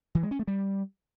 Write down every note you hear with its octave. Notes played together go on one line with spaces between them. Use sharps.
E3
G#3
C#4
A3
G3